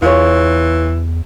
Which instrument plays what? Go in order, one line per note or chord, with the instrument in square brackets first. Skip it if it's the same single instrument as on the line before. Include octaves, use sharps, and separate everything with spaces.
[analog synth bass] E2 [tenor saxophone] E3 [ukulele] F4 G#4 C#5